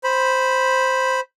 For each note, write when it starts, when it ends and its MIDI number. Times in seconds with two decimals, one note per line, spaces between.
0.04 1.20 72
0.04 1.20 83